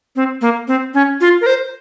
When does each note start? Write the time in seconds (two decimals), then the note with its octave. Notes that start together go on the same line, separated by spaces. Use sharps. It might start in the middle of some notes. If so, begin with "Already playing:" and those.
0.16 C4
0.41 A#3
0.68 C4
0.94 C#4
1.21 F4
1.41 A#4
1.46 C5